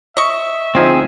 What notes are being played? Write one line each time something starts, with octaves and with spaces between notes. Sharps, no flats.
D#5 E5 C#6
D2 F3 C4 D#4 G#4